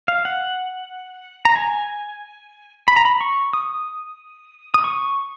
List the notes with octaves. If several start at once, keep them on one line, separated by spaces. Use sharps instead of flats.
F5
F#5
A#5
G#5
B5
A#5
B5
C#6
D#6
D#6
C#6